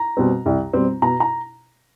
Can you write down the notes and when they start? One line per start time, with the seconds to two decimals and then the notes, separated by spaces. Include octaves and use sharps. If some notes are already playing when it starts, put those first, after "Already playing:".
Already playing: A#5
0.17 B2 G3 C4
0.46 C2
0.73 B2 G3 C4
1.02 B2 A#5
1.20 A#5